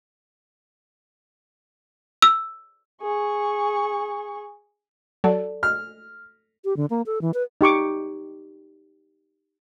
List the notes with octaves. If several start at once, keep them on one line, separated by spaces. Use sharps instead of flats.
E6
G#4 C#6
F#3 A4 D5 A5
F6
G4
D3
A#3
A4
E3
B4
D#4 G4 C#6 D6